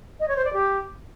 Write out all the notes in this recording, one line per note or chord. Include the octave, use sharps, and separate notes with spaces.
D#5
C#5
C5
D5
G4